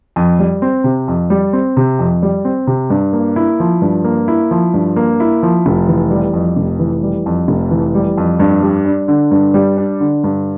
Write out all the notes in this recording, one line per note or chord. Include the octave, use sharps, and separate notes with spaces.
F2
G3
C4
C3
F2
G3
C4
C3
F2
G3
C4
C3
G2
A#3
E4
F3
G2
A#3
E4
F3
G2
A#3
E4
F3
F1
E3
G3
F2
F1
E3
G3
F2
F1
E3
G3
F2
G2
G3
D4
D3
G2
G3
D4
D3
G2